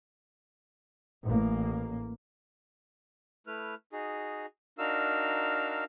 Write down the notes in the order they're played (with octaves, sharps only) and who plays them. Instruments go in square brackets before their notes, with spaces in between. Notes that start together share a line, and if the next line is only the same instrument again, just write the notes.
[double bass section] A1 A#3
[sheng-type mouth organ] A3 E4 B4 F6
D#4 F#4 G#4
D4 D#4 F#4 A#4 F5 E6